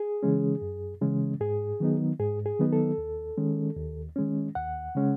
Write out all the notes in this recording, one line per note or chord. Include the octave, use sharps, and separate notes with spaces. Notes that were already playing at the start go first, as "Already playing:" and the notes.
Already playing: G#4
C#3 E3 G#3 C#4
F#2
C#3 E3 G#3 C#4
G#2 G#4
D#3 F#3 B3 D#4
G#2 G#4
G#4
D#3 F#3 B3 D#4
A4
D#2
D#3 G#3 C#4
D#2
D#3 G#3 C#4
D#2 F#5
C#3 G#3 C#4